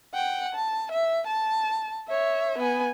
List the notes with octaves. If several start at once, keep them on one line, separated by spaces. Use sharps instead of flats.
F#5 G5
A5
E5
A5
C#5 E5
B3 G#5